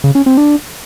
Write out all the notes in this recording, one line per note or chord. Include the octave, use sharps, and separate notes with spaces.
C#3
C#4
C4
D4